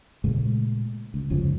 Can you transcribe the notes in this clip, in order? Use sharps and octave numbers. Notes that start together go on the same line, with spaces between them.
A#2 C#3 G#3 A3
C#2
F#1 D2 C#3 F3